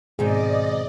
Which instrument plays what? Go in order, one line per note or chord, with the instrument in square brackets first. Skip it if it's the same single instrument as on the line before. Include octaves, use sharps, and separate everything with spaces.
[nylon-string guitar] G#2 D#3 C4 [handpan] B2 G#4 [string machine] D5 D#5